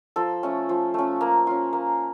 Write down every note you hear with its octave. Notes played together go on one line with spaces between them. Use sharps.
F3 A4
A3 C#4
F3
A3 C#4
A#3
C#4 F4
A#3